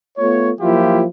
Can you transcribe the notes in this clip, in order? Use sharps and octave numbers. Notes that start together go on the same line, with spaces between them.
A3 B3 F4 C#5
F3 F#3 A#3 E4 F4 G4